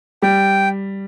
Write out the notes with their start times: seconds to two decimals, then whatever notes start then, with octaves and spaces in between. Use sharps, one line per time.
0.22 G3 G5